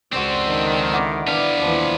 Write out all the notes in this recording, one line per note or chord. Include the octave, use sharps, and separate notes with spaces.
C#2 C4 F#4 A4 C5 D5
D3 D#3
E4 F#5 D6
E3 B3 D4 F5
D#2 E3 F3